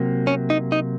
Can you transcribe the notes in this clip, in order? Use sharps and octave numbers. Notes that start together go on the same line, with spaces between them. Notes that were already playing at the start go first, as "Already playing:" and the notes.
Already playing: C3 F#3 A#3
C#4
D#4
D#4